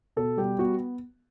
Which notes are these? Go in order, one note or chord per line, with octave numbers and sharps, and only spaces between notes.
B2 A4
G3 G4
B3 F#4